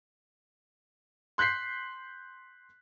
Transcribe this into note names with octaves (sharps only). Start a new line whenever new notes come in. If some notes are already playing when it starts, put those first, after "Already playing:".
C6 F#6 G6 B6 C7